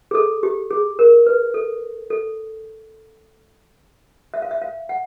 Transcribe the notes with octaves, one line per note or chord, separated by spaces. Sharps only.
G#4
A4
G4
G#4
A#4
B4
A4
A4
E5
F5
E5
F5
F#5